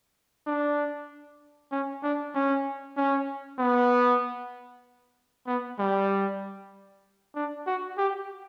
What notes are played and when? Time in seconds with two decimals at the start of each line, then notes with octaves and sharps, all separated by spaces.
0.47 D4
1.72 C#4
2.03 D4
2.35 C#4
2.97 C#4
3.59 B3
5.47 B3
5.79 G3
7.35 D4
7.67 F#4
7.98 G4